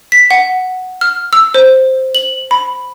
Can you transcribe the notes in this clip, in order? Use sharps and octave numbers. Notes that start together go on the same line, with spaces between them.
B6
F#5
F6
E6
C5
F#7
B5